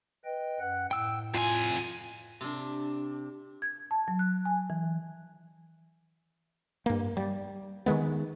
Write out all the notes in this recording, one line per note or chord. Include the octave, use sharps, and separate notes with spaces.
B4 D#5 G5
F#2 F#5 F#6
A2 G5 E6
F2 F4 G#5
C3 D4
G#6
A5
F#3
F#6
G#5
E3
G2 A#3
G3
D#3 E3 G#3 B3